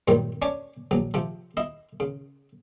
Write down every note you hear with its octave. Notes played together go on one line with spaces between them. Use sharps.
G2 A#2 D#3 F#3 G3
C#4 D4 C#5 D5
A#1 F#3
C3 F3
E4 D#5
C#3